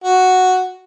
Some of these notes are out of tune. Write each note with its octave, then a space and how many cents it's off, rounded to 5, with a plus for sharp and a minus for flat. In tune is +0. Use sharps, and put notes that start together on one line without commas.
F#4 +0